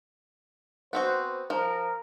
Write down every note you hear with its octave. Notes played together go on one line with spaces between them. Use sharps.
B3 C4 F#4 C5
F3 A#4